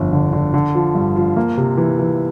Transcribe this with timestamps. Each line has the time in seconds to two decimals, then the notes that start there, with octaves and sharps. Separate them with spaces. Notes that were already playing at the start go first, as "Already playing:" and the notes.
Already playing: G1 F2
0.12 D3
0.33 D3
0.54 D3
0.75 F3
0.95 G2
1.16 F3
1.37 A#3
1.57 C3
1.78 E3
1.99 E3